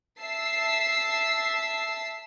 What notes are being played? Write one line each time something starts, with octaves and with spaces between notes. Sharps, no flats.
E5 A5 E6 C7